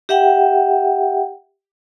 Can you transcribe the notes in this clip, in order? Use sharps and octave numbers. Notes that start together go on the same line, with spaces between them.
G4 E5 F#5 G5